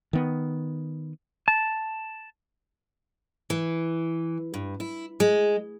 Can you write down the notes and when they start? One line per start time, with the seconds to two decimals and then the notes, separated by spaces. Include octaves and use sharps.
0.13 D#3 B3
1.48 A5
3.50 E3
4.54 G2
4.80 E4
5.20 G#3